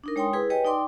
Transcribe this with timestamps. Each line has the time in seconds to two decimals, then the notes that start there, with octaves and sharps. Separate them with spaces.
0.04 D4 D#4 A#4
0.16 G#3 C#5 G5 G#5 C6 D#6
0.33 E4 G#4 B4
0.50 G4 B4 C#5 D#5 G5 G#5
0.65 D#4 D5 G5 C6 D6